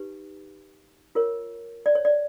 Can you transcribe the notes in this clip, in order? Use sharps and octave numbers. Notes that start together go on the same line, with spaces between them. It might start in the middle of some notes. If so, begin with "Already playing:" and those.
Already playing: D#4 G4 B4
F4 A#4 C#5
D5
C#5
D5